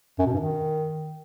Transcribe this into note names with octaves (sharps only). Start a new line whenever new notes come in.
F#2
B2
G2
D#3